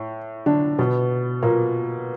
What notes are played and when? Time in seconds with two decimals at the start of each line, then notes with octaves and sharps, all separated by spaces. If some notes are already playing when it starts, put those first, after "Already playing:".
Already playing: A2
0.46 D3 D4
0.79 B2 B3
1.43 A#2 A#3